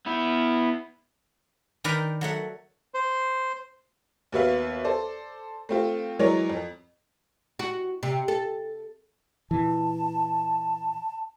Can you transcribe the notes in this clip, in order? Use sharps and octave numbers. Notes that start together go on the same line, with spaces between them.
B3 E4
D#3 A#4 B4 D5 G5 A#5
F#3 A3 F#5
C5
D#2 B3 F#4 B4 E5 F5
A4 C5 D5
A3 C4 F4
E3 F#3 G#3 A#4 C#5 D5
F2
F#4
C3
A4
A#2 E3 A5